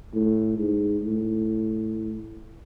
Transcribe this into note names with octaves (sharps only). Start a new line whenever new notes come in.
A2
G#2
A2